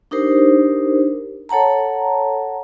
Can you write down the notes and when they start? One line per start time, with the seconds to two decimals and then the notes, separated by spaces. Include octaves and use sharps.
0.11 D4 D#4 G4 A#4 C5
1.49 A4 C#5 F#5 A5 A#5